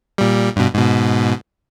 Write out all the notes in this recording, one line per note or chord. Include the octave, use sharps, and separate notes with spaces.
A#2 G3
G2 B2
G#2 B2